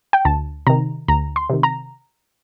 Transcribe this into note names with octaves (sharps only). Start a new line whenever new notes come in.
G5
D2 A5
C3 D#3 A#5
D2 A#5
C6
C3 D#3
A#5